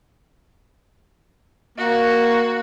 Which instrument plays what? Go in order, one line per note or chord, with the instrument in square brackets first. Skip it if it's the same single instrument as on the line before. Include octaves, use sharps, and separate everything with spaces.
[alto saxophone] A#3 [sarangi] F#4